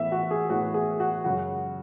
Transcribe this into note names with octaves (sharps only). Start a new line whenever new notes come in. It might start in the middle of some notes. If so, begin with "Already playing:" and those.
Already playing: A2 E3 B3 E5
F#4
G#4
A2 E3 B3 F#4
G#4
F#4
F#2 C#3 G#3 F#4